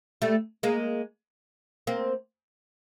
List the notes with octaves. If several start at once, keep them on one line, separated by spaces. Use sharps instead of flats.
G3 A3
G#3 A#3
A#3 C4